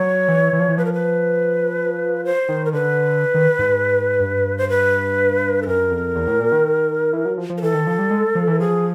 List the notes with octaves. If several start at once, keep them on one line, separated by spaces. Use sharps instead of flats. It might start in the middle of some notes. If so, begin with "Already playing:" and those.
Already playing: F#3 C#5
E3
E3
F3
E3
F3 B4
A#4
B4
C5
D#3
A#4
D3 B4
D#3
G#2
G2
C5
B4
A4
F#2 A#4
F2
E2
A2
A#2
D#3
E3
F#3
F3
F3
A#4
E3 A4
D#3
F3
G3
G#3
F3
E3
F3 G#4